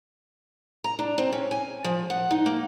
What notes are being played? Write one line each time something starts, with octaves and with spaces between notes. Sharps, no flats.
A#5
D4
C4
C#4
G#5
F3
F#5
D#4
A#3